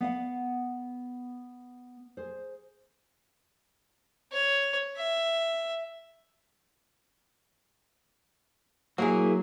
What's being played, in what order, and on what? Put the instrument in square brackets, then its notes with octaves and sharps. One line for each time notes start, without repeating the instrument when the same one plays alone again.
[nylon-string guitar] B3 F5 F#5
G#4 C5
[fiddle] C#5
E5
[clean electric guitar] F#3 [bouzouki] A#3 E4 G#4